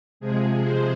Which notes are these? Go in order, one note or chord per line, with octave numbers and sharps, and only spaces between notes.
C3 F3 G#3 G#4
C5